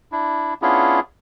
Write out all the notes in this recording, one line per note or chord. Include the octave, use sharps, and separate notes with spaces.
D4 E4
B3 C#4 D4 E4 F4 G#4